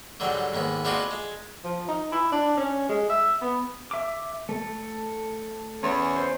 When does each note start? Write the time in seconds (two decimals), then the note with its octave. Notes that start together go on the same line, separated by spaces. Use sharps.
0.20 G#2 D3 F#3 G3
0.54 D#2 G#2 B3
0.85 G#3 B3 C4 D4 F4 F#4
1.11 G#3
1.64 F3
1.88 D#4
2.12 E4
2.32 D4
2.57 C#4
2.89 G#3
3.10 E5
3.42 B3
3.91 E5 D6
4.49 A3 A4
5.83 E2 C#4
6.16 C5